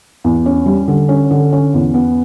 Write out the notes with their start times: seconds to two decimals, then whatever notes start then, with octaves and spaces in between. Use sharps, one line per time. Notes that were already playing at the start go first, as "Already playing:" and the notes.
0.24 E2
0.46 C#4
0.66 G3
0.88 D3
1.09 C#4
1.31 D3
1.53 C#4
1.74 E2
1.94 B3